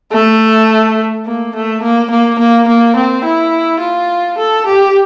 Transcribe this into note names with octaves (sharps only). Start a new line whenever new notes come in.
A3
A#3
A3
A#3
A#3
A#3
A#3
C4
E4
F4
A4
G4